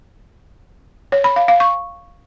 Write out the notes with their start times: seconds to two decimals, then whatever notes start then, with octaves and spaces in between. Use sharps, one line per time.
1.12 C#5
1.24 B5
1.36 F5
1.48 F5
1.60 C#6